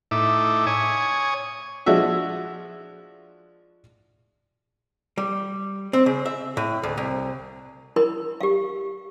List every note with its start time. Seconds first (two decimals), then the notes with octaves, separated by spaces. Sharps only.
0.11 A2 D#4 E5 D6
0.67 C#5 G#5 D#6
1.86 F3 G#3 D4 F#4 E5
5.18 G3
5.93 C4
6.06 C#3
6.26 E5
6.57 A2
6.83 D2
6.97 C2
7.96 E4 A#4 B5
8.41 G4 F5